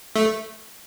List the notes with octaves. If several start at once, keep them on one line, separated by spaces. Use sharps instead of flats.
A3